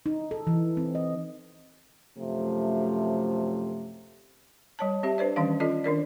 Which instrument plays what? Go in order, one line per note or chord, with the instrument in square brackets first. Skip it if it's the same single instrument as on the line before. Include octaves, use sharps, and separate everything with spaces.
[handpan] D#4
A4
E3
C4
D#5
[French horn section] F#2 C3 F3 A3
[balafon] G3 C#5 A5
C4 G4 E5
D4 B4 C5 D5
D#3 E3 G3 C#4 F5
C#4 F4 A4 D5 D#5
D#3 D4 A#4 D5